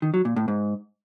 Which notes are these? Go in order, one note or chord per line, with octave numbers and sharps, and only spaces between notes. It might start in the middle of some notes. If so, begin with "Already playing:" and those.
D#3
F#3
A#2
A2
G#2